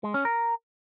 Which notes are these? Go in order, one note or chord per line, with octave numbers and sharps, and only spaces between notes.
G#3
C#4
A#4